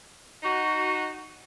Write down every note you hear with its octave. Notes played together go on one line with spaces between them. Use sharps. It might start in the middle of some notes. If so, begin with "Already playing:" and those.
D#4 F#4